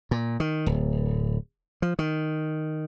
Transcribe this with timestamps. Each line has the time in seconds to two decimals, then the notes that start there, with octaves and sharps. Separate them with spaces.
0.11 A#2
0.40 D#3
0.66 D1
1.82 F3
1.99 D#3